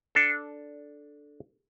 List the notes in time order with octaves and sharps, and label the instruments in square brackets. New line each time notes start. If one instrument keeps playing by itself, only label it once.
[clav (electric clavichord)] D4 A4